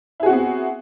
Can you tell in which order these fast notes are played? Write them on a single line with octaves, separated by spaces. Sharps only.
E4 G#4 F#4 C4 B3